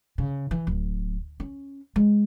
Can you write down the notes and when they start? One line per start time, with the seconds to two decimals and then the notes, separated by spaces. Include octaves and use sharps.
0.18 C#3
0.51 E3
0.67 D1
1.40 C#4
1.96 G#3